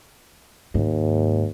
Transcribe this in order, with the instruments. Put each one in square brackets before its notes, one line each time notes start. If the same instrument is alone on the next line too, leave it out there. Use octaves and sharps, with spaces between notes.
[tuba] D#2 [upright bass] G#2